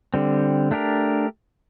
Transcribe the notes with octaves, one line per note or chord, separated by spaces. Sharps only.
D3 G3 C4
A3 D4 G4 A#4